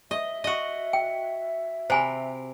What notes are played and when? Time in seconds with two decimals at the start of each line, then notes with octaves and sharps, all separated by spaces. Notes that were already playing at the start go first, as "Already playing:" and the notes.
0.11 D#5 E5
0.44 F#4 D#5
0.93 G5
1.90 C3 C5 G#5 B5